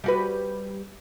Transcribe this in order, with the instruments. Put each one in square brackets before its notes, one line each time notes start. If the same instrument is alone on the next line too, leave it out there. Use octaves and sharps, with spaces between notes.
[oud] G3 F#4 B4